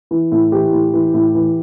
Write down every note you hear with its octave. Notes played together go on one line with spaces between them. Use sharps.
E3
A2
E3 G4
A2
E3
A2
E3